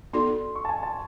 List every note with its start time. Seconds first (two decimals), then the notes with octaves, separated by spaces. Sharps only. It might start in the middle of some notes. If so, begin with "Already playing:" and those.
0.13 B3 D#4 F#4 A4 D5 C6
0.56 C#6
0.65 A5
0.69 G#5
0.83 A5